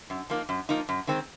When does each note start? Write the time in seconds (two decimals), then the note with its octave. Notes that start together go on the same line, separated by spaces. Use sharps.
0.10 F#2
0.30 F3 A#3 D#4
0.49 F#2
0.69 F3 A#3 D#4
0.89 F#2
1.07 D#3 G#3 C4